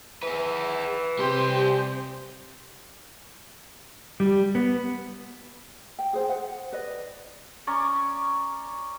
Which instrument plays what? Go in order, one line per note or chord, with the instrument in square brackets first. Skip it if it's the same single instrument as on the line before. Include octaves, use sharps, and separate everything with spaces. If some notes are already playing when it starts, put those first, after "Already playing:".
[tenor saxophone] E3 [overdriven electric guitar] G#4 B4
[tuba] C3 [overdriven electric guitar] G3 C6 [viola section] G4 C5
[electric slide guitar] G3
B3
[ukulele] G5
G#4 C5 G5
F#5
B4 D5 D#5
[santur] C#4 D5 A#5 C#6